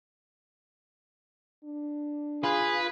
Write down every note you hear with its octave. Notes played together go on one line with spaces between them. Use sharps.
D4
F4 G#4 B4